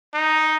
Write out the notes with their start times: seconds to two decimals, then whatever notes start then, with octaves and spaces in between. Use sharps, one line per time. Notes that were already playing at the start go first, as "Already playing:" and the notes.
0.14 D#4